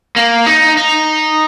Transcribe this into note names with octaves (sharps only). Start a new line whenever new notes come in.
A#3
D#4
D#4